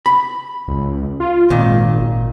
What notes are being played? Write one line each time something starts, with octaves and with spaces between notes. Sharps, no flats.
B5
C#2
F4
G#1 A#2 D#3